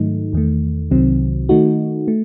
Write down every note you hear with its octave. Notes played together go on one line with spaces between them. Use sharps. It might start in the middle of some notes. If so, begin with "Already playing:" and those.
Already playing: G#2 D#3 F#3 A3 D#4
E2 D#3 A3
C2 C3 D#3 F#3 C4
D#3 A3 D#4 F#4
A3